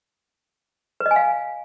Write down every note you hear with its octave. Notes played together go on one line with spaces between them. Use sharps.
B4
D#5
G#5
F5